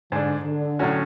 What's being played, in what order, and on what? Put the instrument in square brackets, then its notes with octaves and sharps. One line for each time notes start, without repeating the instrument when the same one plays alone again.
[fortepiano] G#2 G#3 D4 [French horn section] D3
[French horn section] D3
[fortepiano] A2 F#3 C#4 F#4